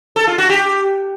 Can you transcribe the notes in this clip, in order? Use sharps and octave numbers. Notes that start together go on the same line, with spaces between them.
A4
F4
F#4
G4